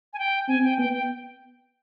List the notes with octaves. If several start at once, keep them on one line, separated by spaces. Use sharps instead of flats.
G#5
G5
C4 G#5
G5
B3 G5
G5